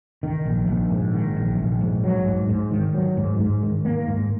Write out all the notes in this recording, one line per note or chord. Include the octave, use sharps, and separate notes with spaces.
D#3
A#1
A#1
G#2
D#3
A#1
A#1
G#2
F#3
G#2
G#2
D#3
F#3
G#2
G#2
D#3
A#3
G#2